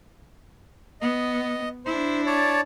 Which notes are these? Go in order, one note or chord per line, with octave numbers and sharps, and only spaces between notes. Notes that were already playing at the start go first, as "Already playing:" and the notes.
B3 D#5
D4 E4 C5
C#5 D5 A5